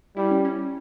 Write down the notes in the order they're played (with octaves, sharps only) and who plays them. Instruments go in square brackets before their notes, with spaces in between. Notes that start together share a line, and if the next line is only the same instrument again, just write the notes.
[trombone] G3 [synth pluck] E4
[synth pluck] C#4
C#4